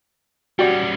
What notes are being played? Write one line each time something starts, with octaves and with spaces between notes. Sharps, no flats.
G3 C#4 F#4 G4 D5 F#5